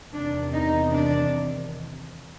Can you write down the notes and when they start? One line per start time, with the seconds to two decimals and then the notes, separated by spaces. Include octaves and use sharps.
0.13 E2 C3 D#3 D4
0.53 D#4
0.93 D4